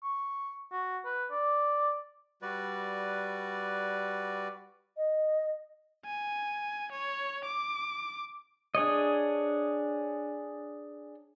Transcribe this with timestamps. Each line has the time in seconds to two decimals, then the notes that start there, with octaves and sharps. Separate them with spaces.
0.03 C#6
0.72 F#4
1.05 B4
1.31 D5
2.42 G3 F#4 B4 D5
4.97 D#5
6.05 G#5
6.92 C#5
7.45 D6
8.75 D4 G#4 C#5 D#5